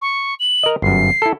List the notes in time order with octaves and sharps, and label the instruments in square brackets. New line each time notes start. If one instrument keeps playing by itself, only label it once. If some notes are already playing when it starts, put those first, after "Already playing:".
[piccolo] C#6
F#7
[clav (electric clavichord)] A#4 D#5
[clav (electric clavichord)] G1 F#2 [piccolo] C7
[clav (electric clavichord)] E4 A4